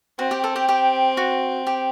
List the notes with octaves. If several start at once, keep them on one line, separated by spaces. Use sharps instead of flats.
C4 F#4
G4
A4
G4
G4
F#4
G4